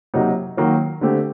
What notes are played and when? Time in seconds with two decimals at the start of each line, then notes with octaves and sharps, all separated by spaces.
0.14 C3 F#3 A#3 D#4 G4
0.57 D#3 F#3 A#3
1.01 D3 A3 C4 G4